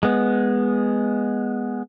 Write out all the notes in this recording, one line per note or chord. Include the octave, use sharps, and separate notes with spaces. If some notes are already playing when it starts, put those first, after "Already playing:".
G#3 B3